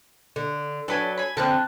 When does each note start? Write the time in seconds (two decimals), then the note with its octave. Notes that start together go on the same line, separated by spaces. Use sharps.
0.36 D3
0.88 F#3 D4 A4 B4 G#5
1.17 G#5 B5
1.37 D3 F3 C4 A5 F#6